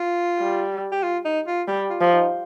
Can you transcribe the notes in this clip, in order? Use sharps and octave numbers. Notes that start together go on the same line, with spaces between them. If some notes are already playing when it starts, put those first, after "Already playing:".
Already playing: F4
G3
G4
F4
D#4
F4
G3 G4
F4
F3
D#4